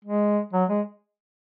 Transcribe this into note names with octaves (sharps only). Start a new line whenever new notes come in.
G#3
F#3
G#3